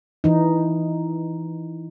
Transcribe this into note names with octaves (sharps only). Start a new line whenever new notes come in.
E3 D#4